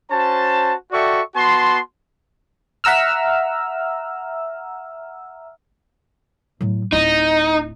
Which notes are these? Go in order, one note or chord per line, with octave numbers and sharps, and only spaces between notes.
C#4 F#4 C5 A5
F#4 A4 D5 E5 G5 C#6
B3 F#4 A5 C6
E5 F#5 A#5 E6 F6
A2 F#3
D1 D#4 E4